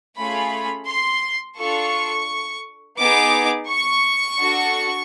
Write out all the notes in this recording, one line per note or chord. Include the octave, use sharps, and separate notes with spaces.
A3 C#4 F4 G#4 B5
C6
D4 F4 A4 C#6
B3 D#4 G#4 D6
C#6
D4 F#4 A4